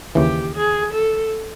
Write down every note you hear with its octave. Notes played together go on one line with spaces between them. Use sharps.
D#2 C#3 E3 G4
G#4
A4